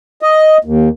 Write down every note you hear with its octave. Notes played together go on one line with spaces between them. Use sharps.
D#5
D#2